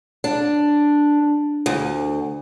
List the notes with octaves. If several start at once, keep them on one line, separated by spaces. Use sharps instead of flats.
D4
D2